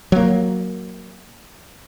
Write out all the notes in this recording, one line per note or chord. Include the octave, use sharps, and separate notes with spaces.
F#3 A#3